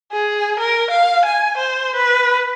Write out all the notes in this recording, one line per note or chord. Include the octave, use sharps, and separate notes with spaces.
G#4
A#4
F5
G#5
C5
B4